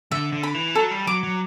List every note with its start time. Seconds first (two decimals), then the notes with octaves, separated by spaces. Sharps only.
0.12 D3 E5
0.33 D3
0.43 B5
0.54 E3
0.75 F#3 A4
0.91 G3
1.07 F#3 D6
1.23 F#3